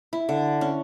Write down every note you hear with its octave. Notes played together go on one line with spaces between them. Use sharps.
E4
D3
C#4